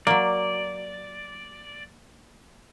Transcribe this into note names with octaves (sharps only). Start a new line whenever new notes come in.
F#3 A#3 D5